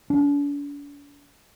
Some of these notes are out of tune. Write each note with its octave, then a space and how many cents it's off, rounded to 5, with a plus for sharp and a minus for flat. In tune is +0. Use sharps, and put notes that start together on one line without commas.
D4 -45